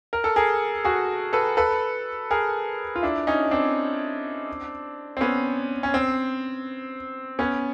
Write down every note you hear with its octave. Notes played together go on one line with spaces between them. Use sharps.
A#4
A4
G#4 A#4
F#4 G#4
A4 B4
A4 B4
G#4 A#4
F4
D4 E4
C#4 D#4
C4 D4
C4
B3 C#4
C#4
C4
B3 C#4